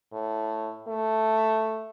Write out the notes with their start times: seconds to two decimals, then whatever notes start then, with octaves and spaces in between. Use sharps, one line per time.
0.13 A2
0.88 A3